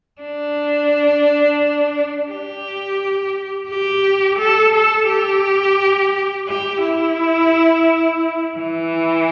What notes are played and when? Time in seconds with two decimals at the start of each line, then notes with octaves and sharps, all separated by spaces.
0.21 D4
2.30 G4
3.69 G4
4.39 A4
4.74 A4
5.09 G4
6.48 G4
6.84 E4
8.58 E3